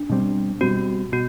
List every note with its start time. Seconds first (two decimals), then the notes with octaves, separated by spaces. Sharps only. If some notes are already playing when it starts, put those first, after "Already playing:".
Already playing: D4
0.10 B2 G3 C4
0.61 B2 G3 C4 F#4
1.12 B2 F#4